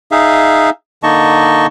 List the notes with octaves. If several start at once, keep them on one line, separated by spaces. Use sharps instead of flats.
D#4 G#4 E5 F5
D3 A#3 D#4 D#5 A5 C#6